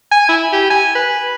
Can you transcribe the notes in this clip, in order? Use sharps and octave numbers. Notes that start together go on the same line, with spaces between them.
G#5
E4
G4
G#5
B4